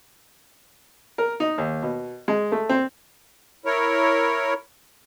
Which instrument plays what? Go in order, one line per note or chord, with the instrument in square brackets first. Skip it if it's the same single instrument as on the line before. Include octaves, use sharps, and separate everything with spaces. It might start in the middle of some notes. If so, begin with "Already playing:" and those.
[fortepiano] A#4
D#4
D#2
B2
G#3
A3
C4
[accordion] E4 A#4 C#5